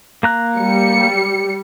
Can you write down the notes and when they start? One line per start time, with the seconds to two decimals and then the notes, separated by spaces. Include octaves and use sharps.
0.23 A#3 A#5 F#6
0.57 G3 C#7